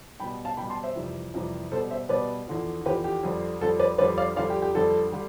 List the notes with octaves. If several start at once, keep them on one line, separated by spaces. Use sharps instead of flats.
B2 G3 G5 B5
F5 A5
B2 G3 G5 B5
A5 C6
C5 E5
F2 C3 E3 G3
F2 C3 E3 G3
B2 G3 A4 C5
C5 E5
B2 G3 B4 D5
E2 D3 F3
E2 D3 F3 G4 B4
G4
F2 D3 G3
F2 D3 G3 A4
B4 D5
F2 D3 G3 B4 D5
D5 F5
F2 D3 G3 D5 F5
G4
G4
F2 D3 G3 A4
D3 G3